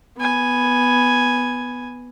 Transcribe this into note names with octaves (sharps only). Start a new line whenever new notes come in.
B3 G#5